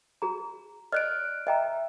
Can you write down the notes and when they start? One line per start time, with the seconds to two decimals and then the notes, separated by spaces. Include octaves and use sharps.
0.22 F#4 G#4 A#5
0.92 D5 D#5 F6 F#6 D7
1.47 D#5 E5 G5 A#5